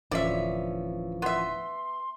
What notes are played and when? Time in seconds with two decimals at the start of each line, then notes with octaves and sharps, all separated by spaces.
0.11 D1 E3 F3 C#4 D5 E5
1.22 B3 E5 C6